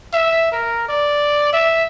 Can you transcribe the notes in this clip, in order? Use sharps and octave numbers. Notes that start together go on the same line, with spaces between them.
E5
A#4
D5
E5